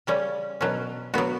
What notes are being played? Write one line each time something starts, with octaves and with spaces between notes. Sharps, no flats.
C#3 G3 C#4
B2 F#3 C#4
F#3 B3 F#4